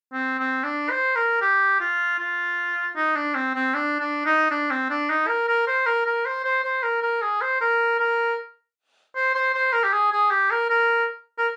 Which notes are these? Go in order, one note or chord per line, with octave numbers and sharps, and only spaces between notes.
C4
C4
D4
C5
A#4
G4
F4
F4
D#4
D4
C4
C4
D4
D4
D#4
D4
C4
D4
D#4
A#4
A#4
C5
A#4
A#4
C5
C5
C5
A#4
A#4
G#4
C5
A#4
A#4
C5
C5
C5
A#4
G4
G#4
G#4
G4
A#4
A#4
A#4